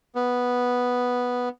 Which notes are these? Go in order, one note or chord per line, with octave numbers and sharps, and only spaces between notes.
B3